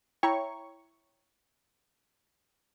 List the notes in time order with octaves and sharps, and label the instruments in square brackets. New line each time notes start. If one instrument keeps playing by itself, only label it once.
[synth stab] E4 C#5 C#6 [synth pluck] G5 A#5